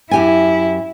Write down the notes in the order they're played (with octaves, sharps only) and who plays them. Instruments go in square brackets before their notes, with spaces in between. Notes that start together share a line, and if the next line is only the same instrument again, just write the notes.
[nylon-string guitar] F#2 G4 G#5 [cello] E4